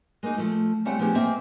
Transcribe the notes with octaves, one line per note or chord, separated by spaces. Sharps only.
G#3 A#3 B3 D#4 F#4
F3 A3
C#3 G3 A3 C4 F#5
F3 B3 D4 G4 G#4
G#2 A#3 C4 E5